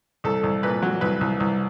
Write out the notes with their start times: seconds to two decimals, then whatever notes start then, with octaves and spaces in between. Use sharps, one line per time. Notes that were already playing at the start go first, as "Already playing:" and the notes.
0.24 C2 A4
0.43 C2
0.63 A#2 B4
0.82 F#3
1.01 C2 B4
1.21 C2
1.40 C2